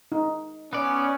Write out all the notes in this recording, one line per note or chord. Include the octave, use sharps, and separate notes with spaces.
D#4
B3 C#4 D5